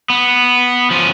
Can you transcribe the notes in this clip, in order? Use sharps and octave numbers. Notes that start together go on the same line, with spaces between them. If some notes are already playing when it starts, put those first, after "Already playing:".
B3
F3 C#4